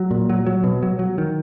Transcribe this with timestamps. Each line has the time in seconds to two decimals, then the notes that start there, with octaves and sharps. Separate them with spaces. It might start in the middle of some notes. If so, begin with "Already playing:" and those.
Already playing: F#3
0.11 A#2
0.30 F#3
0.46 F#3
0.64 B2
0.83 F#3
0.99 F#3
1.18 D#3